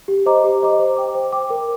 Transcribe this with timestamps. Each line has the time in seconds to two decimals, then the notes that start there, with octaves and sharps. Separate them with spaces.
0.08 G4
0.26 C5 D#5 A#5 D6
0.44 G4
0.62 C5 D#5 A#5 D6
0.79 C5
0.97 G5 D6
1.15 C5
1.32 G5 D6
1.50 A#4